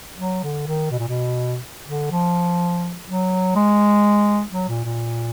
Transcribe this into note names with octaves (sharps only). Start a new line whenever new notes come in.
F#3
D3
D#3
B2
A#2
B2
D3
F3
F#3
G#3
F#3
A#2
A#2